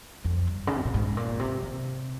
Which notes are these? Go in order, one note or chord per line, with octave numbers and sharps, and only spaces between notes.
F2
G2
C#3
C3
A#2
G#2
A#2
C3
C3